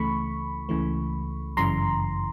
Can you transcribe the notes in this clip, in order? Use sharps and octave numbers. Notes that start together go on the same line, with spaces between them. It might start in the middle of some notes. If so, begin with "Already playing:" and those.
Already playing: C#2 C#3 E3 A3 B5 C#6
C#2 C#3 E3 A3
G1 F#2 C#3 E3 A#5 C6